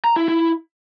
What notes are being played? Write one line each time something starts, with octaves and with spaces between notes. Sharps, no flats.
A#5
E4
E4